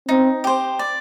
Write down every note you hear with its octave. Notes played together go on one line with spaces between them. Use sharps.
C4 D#4
G4 C5
D5